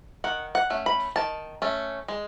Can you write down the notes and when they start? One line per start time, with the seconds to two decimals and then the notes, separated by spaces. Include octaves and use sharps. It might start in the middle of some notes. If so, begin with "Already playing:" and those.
0.24 D#3 F#5
0.55 F#5
0.70 A3 C#4
0.86 B5
1.16 D#3 A5
1.62 A3 C#4
2.08 G#3